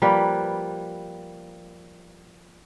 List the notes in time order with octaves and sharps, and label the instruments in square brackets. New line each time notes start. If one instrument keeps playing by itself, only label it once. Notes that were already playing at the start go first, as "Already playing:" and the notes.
[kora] F3 G3 A#3 B4